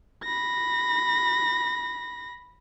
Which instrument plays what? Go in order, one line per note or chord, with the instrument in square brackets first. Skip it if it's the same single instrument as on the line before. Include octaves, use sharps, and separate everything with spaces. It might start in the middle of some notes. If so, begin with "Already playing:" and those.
[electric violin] B5 A#6